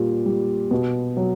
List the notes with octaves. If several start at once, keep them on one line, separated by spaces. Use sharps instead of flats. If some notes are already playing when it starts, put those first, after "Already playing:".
Already playing: A#2 G3
G3
B2
F#3